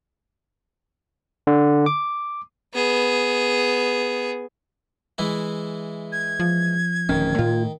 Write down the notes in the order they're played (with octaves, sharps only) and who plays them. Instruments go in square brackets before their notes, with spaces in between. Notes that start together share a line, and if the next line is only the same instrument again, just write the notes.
[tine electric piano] D3
D6
[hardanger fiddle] B3 G#4
[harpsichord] E3 G#3 E4
[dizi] G#6
[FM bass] F3
[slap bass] D1 C#4 [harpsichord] D#3
[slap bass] A2 [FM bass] F4